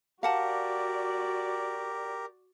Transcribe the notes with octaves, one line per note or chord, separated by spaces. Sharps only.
F#4 G4 A#4 D5 F5 F#5 A5